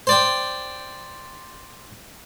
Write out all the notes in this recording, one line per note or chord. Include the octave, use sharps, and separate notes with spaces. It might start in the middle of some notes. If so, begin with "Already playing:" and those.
C5 D5 G5